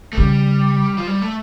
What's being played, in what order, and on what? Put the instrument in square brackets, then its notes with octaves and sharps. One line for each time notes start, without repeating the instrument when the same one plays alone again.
[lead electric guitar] A3
[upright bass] C#3 [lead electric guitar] G3
[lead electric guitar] F3
G3
A3